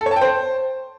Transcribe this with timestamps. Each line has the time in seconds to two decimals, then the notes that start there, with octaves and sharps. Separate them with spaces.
0.01 A4
0.06 C#5
0.11 A5
0.16 G5
0.21 C5